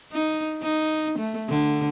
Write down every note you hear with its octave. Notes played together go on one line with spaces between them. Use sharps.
D#4
D#4
A3
D3